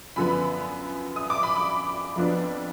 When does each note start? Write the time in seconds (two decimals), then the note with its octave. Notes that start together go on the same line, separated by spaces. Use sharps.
0.16 F#2 D3 F3 B3 B5
1.16 D#6
1.30 D6
1.43 B5
1.56 D6
2.16 F2 F3 B3 D4